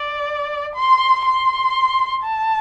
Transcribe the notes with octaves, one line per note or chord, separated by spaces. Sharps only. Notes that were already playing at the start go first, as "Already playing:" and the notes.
Already playing: D5
C6
C6
A5